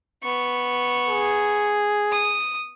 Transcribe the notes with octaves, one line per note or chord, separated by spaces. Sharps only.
B3 C#6
G#4
D#6